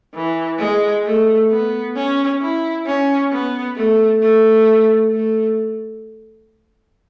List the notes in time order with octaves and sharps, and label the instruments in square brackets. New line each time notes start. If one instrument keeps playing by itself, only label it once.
[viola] E3
G#3
A3
B3
C#4
E4
C#4
B3
A3
A3
A3